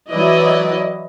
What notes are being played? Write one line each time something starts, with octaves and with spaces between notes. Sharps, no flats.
E3 F#3 E4 B4 D5 D#5